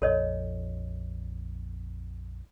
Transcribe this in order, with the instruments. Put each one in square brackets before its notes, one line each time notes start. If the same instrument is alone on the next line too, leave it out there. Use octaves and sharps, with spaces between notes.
[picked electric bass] A#1 F2 [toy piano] A4 C#5 D#5